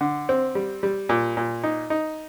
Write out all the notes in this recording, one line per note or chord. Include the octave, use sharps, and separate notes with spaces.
D3
C4
G3
G3
A#2
A#2
D#4
D#4